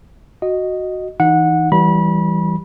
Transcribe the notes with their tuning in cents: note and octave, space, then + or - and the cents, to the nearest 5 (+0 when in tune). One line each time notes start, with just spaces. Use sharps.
F#4 +0 D#5 +0
E3 -15 D#4 +0 F#5 -20
E3 +0 G3 -10 B5 -30